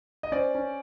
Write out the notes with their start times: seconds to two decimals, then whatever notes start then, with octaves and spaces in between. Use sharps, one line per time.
0.23 D#5
0.32 C#4 C5 D5
0.55 C#4